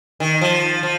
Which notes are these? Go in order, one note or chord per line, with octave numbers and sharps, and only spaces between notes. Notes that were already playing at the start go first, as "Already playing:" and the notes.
D#3
F3
F3